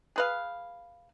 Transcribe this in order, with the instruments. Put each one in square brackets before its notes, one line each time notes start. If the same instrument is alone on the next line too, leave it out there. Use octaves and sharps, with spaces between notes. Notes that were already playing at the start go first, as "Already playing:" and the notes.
[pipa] G#4 B4 F5